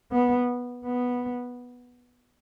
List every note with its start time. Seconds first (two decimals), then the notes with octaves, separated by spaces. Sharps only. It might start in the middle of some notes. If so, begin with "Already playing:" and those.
0.12 B3
0.85 B3